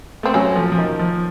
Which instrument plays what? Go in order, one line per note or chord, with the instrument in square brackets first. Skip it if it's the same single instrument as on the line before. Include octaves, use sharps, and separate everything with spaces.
[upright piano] A3 [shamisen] C4
[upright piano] F#3 [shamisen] C#4
[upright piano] F3
F3
D#3
F3